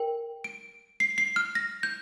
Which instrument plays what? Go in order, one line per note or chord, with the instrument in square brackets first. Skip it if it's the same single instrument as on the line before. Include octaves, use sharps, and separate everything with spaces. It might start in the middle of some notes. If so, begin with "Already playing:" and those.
Already playing: [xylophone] A#4 G5
D7
C7
C7
F6
A#6
G6